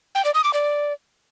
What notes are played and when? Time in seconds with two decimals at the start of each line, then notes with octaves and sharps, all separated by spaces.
0.15 G5
0.25 D5
0.34 D#6
0.44 D6
0.54 D5